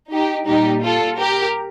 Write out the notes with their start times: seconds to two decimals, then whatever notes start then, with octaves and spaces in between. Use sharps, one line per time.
0.11 D#4 G4
0.47 A#2 G3 D#4 G4
0.83 F4 A4
1.19 G4 A#4